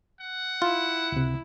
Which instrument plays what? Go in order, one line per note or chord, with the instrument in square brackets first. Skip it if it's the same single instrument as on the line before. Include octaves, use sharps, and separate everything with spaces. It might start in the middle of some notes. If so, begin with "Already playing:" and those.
[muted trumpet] F#5
[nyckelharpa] E4 [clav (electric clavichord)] F4
[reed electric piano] C#2 C3